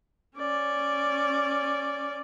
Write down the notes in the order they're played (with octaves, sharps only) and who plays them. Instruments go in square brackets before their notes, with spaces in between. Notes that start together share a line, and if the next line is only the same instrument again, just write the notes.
[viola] C#4 D5